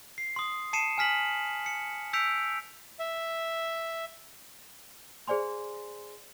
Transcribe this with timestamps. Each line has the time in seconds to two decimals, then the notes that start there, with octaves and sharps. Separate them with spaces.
0.18 C7
0.36 C6 D#6
0.73 A5 C7 C#7 D#7 E7
0.98 G#5 F6 B6 F#7
1.66 C#7
2.13 E6 G6 B6 C#7 D7 F7
2.99 E5
5.28 G#4 C5 D5 G#5 C6